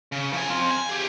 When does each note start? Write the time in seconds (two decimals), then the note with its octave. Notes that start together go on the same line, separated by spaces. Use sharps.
0.12 C#3
0.33 F3 G#5
0.50 C4 F4
0.70 G#5
0.89 G4 G#4